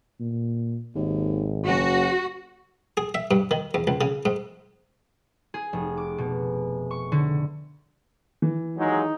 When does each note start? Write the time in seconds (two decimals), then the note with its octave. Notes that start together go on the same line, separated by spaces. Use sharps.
0.20 A#2
0.95 G#1 D#2
1.67 F#1 F#4
2.97 G#4
3.14 E5
3.31 G2
3.51 D#3
3.74 E2
3.87 C#2
4.01 C#3
4.25 G#2
5.54 G#4
5.73 F1
5.97 D6
6.18 B2
6.91 C#6
7.12 D3
8.42 E3
8.77 D#2 F#3 G#3 D#4